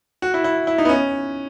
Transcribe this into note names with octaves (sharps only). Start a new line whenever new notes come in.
F#4
E4
E4
E4
D#4
B3
C#4